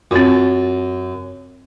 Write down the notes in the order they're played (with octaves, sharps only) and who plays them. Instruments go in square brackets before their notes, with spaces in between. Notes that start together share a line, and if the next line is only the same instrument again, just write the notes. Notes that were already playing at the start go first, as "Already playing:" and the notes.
[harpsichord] F#2 [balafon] C4 F4